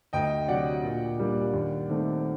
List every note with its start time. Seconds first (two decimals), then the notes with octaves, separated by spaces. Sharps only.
0.13 D2 D#5 G5
0.48 C3 F#3 D5 F#5
0.83 A#2
1.18 G3 A#3 D4
1.53 D#2
1.89 D#3 A3 C4 D#4